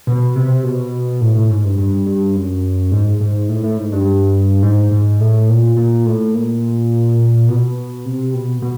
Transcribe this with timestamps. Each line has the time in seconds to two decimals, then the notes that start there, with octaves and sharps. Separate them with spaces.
0.07 B2
0.36 C3
0.64 B2
1.21 A2
1.35 A2
1.50 G#2
1.64 G2
1.78 G2
2.06 G2
2.35 F#2
2.92 G#2
3.21 G#2
3.49 A2
3.64 A2
3.78 G#2
3.92 G2
4.63 G#2
4.92 G#2
5.20 A2
5.49 A#2
5.77 A#2
6.06 A2
6.34 A#2
7.48 B2
8.05 C3
8.34 B2
8.62 B2